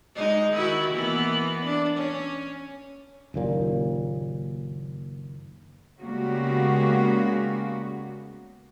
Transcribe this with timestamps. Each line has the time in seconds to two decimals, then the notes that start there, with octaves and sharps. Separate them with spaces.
0.16 G#3 D#4
0.52 D#3 E4 F#4
0.92 E3 A#3 B3
1.65 D4
1.96 C#4
3.34 F#1 D#2 A#2
6.00 C#3 G3 G#3 A#3 B3 F#4